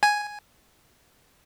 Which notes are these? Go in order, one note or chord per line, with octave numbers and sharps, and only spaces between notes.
G#5